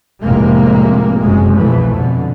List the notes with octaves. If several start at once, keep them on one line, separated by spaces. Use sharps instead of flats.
F1 A2 C3 G#3 A#3
F#1 F#2 C3 G#3
C2 F2 B2 E3 A3
B2 D3